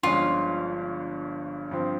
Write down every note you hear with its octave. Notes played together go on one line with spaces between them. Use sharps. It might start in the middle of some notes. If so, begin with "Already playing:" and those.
G1 G2 F3 G#3 C#4 F4
G2 F3 C4